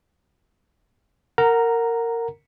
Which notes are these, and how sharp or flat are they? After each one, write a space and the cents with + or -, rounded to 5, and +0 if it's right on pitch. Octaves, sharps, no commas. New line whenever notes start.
A#4 -15 F#5 +0 A#5 +0